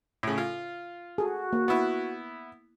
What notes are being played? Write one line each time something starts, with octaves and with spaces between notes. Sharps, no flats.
A2 C#3
F4
F#4 G#4 A4
A#3
B3 E4